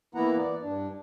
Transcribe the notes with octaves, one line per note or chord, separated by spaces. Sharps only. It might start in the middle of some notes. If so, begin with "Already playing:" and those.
E3 A#3 B3 E4 F#5 A#5
D5
G2 D4